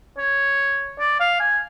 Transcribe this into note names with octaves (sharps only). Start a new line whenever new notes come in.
C#5
D5
F5
G#5